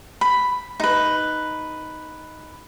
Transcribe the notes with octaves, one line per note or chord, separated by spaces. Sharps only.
B5
D#4 B4